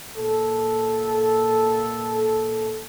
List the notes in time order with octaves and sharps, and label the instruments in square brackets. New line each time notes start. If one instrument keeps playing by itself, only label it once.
[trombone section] A#2 A4